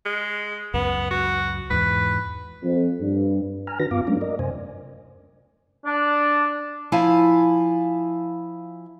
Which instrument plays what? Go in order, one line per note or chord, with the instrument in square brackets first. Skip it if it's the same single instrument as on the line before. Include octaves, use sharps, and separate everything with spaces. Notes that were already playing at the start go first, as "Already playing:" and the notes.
[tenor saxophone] G#3
[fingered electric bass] C#2 F#2 [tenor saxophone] B3
[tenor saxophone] F#4
[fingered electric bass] E2 G#2 [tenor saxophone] B4
[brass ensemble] F2
G2
[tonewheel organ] G#5 A#5 F6
D#3 D4 F#4 B4 A#6
G2 B3 F4 F5 D6
F#3 G#3 A3 C#4 D4
A#4 D5 D#5
F#2 C3 C5 G#5
[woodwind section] D4
[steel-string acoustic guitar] F3 E4 F5 G#5 A5